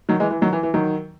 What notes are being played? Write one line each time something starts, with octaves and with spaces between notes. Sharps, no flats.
D#3 F#3
E3 G#3
E3
D#3 F#3
E3
E3
D#3 F#3